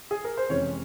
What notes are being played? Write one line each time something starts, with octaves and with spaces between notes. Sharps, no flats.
G#4
A#4
C5
F2 C3 E3 G#3 C#4 C#5